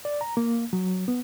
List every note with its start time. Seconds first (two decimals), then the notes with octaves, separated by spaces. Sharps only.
0.05 D5
0.21 A#5
0.37 A#3
0.73 F#3
1.08 B3